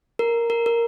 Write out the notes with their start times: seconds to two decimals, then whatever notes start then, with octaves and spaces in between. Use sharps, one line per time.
0.19 A#4
0.50 A#4
0.66 A#4